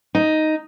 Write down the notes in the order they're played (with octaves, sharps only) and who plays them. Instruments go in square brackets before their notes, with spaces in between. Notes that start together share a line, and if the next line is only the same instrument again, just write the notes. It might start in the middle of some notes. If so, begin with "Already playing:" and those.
[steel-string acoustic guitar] D#4